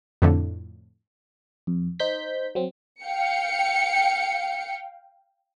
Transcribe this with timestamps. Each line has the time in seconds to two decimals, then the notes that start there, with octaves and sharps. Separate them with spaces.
0.22 F2 A2 D3
1.67 F2
1.99 D#4 C5 G6 B6
2.55 F#3 C4
3.04 F5 G5 C#7